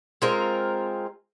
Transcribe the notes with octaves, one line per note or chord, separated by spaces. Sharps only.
G#3 C4 F4 A#4